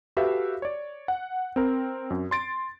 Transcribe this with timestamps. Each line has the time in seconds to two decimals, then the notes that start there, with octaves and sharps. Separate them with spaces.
0.17 F#4 G4 A4 B4 E5 F5
0.62 C#5 D5
1.08 F#5
1.56 C4 A#4
2.10 F#2
2.31 C6 A6 D7